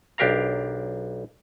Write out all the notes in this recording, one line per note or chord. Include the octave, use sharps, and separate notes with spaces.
B1 D4 G4 A#4 F5 A#5